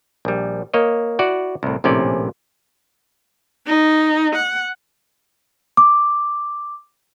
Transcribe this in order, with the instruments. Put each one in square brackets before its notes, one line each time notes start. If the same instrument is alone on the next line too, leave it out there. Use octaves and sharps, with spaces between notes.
[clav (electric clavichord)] A#1 G3
A#3 C#5 D#5
E4 F#4 D5 F#5
C2 A2
A#1 A2 C3 C#4 D5
[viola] D#4
F#5
[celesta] D6